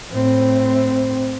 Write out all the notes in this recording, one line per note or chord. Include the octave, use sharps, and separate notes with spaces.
A2 C4